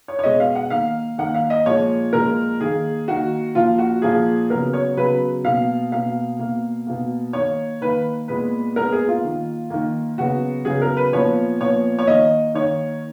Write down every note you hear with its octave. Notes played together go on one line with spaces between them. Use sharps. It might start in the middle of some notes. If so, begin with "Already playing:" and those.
C#5
C#5
B2 G#3 B3 D#5
F5
F#5
D#3 A#3 F5
D#3 A#3 F#5
F5
D#5
A#2 F3 G#3 C#5
A#2 F3 G#3 A#4
D#3 A#3 G#4
D#3 A#3 F#4
A#2 F3 A#3 F4
F#4
A#2 F3 A#3 G#4
C#3 F#3 B3 A#4
C#5
C#3 F#3 B3 B4
B2 A#3 F5
B2 A#3 F5
B2 A#3
B2 A#3
D#3 A#3 C#5
D#3 A#3 B4
A#2 G#3 B3 B4
A#2 G#3 B3 A#4
G#4
F4
D#3 A#3
D#3 A#3
C#3 F#3 B3 F#4
C#3 F#3 B3 G#4
A#4
B4
A#2 F3 B3 C#5
A#2 F3 B3 C#5
C#5
D#3 A#3 D#5
D#3 A#3 C#5